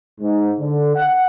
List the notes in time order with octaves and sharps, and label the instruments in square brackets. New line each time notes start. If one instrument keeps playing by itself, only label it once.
[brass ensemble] G#2
D3
F#5